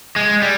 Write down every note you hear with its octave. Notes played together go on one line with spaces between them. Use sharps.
G#3
G3